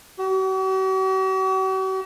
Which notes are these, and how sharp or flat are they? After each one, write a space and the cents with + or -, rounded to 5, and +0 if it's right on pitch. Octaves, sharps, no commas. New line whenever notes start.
F#4 +45